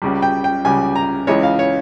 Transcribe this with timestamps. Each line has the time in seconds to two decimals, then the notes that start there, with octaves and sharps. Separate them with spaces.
0.02 C#2 C#3 G3
0.22 G5
0.44 G5
0.65 C#2 C#3 G3 G#5
0.96 A#5
1.27 C#2 C#3 E3 G#3 C#5
1.43 F5
1.59 C#5